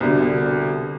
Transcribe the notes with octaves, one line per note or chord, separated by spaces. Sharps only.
C2 B2 D3